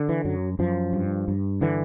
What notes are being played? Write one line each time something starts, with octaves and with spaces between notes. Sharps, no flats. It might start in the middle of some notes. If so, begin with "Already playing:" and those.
Already playing: D3
E3
F#2 F#3
F#2 F3
G2
G2
D3 E3